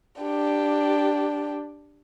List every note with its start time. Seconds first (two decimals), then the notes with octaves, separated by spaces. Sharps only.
0.21 D4 G4